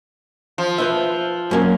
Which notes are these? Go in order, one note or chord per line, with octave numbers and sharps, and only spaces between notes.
F3
B4 C5 E5
F#2 A#3 C#4